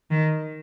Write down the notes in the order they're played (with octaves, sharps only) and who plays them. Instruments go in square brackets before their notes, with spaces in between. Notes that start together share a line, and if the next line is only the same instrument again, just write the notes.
[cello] D#3